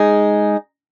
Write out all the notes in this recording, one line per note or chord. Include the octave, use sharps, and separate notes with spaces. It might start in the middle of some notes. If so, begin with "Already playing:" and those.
Already playing: G#3 D#4 G#4